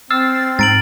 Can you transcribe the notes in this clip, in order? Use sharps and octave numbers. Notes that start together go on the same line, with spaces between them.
C4 E6 F6 A6 C7
G#2 A#5 A6 D7 F#7